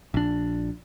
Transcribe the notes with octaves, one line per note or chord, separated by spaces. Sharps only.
A#1 D4